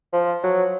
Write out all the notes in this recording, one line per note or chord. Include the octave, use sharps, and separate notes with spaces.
F3
F#3